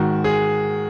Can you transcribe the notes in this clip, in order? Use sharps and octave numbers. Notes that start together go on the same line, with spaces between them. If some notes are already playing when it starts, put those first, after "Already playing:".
Already playing: G#2 D#3 G#3 F#4
G#4